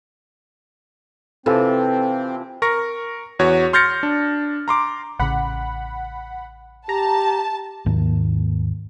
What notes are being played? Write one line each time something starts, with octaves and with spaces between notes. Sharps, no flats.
C3 E3 F3 C4 A4
A#4 C#6 A#6
E2 F#4 C#5
C6 F6 G6 A6 A#6 C#7
D4
A#5 C6 D6
A1 C#3 F#5 B5
G4 A5 A#5
D#2 G#2 D#3 A#3